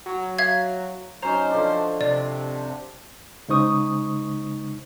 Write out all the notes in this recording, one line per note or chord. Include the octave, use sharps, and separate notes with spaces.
F#3
E5 F5 G#6
F#3 C#4 D#4 C5 A#5
D3 F3 D4
C3 D5
C#3 G#3 D#4 C5 C#6 D#6